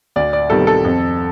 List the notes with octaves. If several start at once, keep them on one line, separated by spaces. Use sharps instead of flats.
D2 D5
D5
C3 D#3 G3 B3 A4
A4
F2